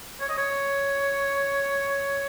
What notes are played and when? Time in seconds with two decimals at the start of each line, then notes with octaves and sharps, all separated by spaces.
0.20 C#5
0.29 D#5
0.38 C#5